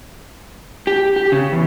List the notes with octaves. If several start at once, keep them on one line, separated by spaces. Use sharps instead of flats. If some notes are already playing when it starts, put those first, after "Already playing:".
G4
G4
C#3
E2